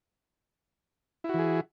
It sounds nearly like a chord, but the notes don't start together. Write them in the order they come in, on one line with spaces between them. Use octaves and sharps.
E4 F#4 E3 G#4